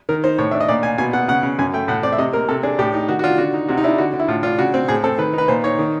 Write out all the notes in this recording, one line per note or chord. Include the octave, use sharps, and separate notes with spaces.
D#3 A#4
D#4 C5
A2 C#5
D4 E5
D#5
A#2 D5
A#2 G#5
B2 G#5
B2 F#5
C#3 F#5
C#3
F#2 G#5
A3 G5
A2 F#5
C4 D5
E5
C3 D#5
A#3 A#4
C3 A4
D4 G#4
A2 G4
D#4
D#3 F#4
F#4
D4 F4
D3 F#4
D#4
C3 F#4
D#4
D4 E4
D3 F#4
D3
E4
A2 F4
D4 F4
C#3 F#4
C4
A2 G#4
C4 A4
D#3 B4
D#4 B4
A#2 C5
D#4 C#5
D#3